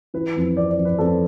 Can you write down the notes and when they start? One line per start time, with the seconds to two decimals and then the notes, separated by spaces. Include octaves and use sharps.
0.14 E3 B4
0.36 F2
0.57 C4 D5
0.71 D5
0.78 F2
0.85 B4
0.98 F2 A4